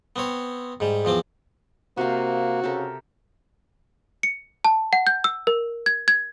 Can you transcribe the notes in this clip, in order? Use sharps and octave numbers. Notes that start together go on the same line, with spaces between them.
B3 C4 C#5
G#2 G3
E2 F3 C4 D6
C3 A#3 F#4 F5
C#3 G4 A4 A#4
C#7
A5
F#5
G6
E6
A#4
G#6
G#6